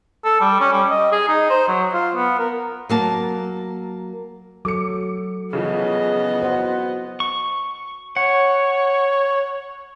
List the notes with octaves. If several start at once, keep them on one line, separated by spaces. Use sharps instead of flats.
A4
G3
C#4
G3
D#5
G#4
D#4
C5
F#3
F4
B3
A#4
F#3 A#3 A5
F#3 A4 D6 C#7
C#3 E3 F3 B3 G#4 D#5
F#4 C5 F#5
C#6
C#5 F#5